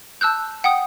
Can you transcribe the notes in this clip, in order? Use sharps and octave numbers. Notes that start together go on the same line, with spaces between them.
A5 E6 F#6 G6
F#5 G5 D#6